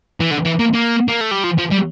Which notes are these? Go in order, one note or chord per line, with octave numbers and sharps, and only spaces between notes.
E3
D3
E3
A#3
A#3
A#3
A3
G3
F3
F3
G3